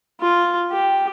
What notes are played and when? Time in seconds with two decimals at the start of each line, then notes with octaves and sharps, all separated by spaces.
0.21 F4
0.72 G4